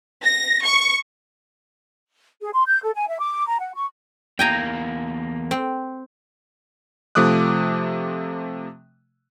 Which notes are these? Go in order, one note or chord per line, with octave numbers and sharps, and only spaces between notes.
A#6
C#6
G#4
C6
G6
A4
G#5
E5
D6
A#5
F#5
C#6
E2 A#3 G5 G#5 A#5
C4
C3 F3 A3 D6 D#6 F#6